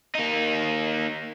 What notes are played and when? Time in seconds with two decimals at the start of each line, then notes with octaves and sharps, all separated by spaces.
0.15 A#3 D#4